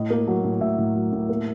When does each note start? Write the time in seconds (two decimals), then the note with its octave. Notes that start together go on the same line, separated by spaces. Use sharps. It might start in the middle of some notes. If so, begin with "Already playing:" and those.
Already playing: A2 D#5
0.10 A#3
0.27 F#3
0.44 A2
0.61 A2 E5
0.78 A2
0.95 F#3
1.13 A2
1.29 A#3